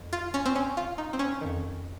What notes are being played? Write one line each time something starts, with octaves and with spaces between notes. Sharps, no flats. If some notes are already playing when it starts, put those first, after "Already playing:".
Already playing: F2
F4
C#4
C4
C#4
F4
D#4
C4
C#4
F2 D#3